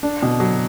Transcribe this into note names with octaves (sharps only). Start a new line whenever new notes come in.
D4
B2
F#3